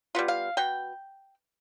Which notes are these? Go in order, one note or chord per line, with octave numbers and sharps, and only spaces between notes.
G3 B3 F4
F5
B2 G5